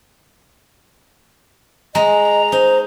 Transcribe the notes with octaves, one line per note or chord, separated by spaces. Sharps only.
G#3 D#5 A#5
D#4 C5